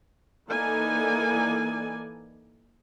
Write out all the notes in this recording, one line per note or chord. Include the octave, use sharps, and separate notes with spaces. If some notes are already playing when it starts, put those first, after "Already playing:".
E3 A#3 D#4 A4 D5 G#5